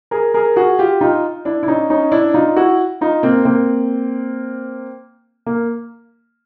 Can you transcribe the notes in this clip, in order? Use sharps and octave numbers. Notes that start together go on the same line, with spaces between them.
G#4 A#4
G#4 A#4
F#4 G#4
F4 G4
D#4 F4
D4 E4
E4
C#4 D#4
C#4 D#4
D4 E4
D#4 F4
E4 F#4
D#4 F4
A#3 C4
A#3 C4
A#3